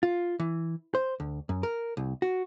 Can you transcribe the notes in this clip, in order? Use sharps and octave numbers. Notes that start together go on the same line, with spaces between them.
F4
E3
C5
D2
F#2
A#4
C2
F#4